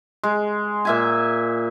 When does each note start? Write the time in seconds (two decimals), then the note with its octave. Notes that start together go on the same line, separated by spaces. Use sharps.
0.23 G#3
0.85 A#2 E5 G#5